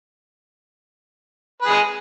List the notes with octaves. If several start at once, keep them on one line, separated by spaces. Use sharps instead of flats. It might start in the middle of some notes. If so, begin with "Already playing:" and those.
G#3 G#4 B4